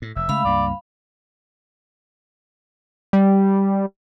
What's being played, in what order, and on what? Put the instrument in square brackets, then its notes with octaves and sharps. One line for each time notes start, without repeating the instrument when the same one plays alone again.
[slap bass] A2
[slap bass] F1 [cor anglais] E5
[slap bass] C#3 G#3 A3 [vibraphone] F5 B5
[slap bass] C#2 G2 A#3 [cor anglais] D5
[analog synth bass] G3